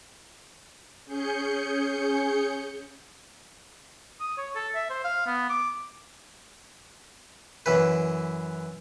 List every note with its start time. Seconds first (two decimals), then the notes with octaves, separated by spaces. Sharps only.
1.05 C#4 G#4 G6 C#7
4.20 D#6
4.38 C#5
4.55 A4
4.75 E5
4.90 C5
5.04 F5
5.26 B3
5.49 D6
7.66 F#2 E3 B4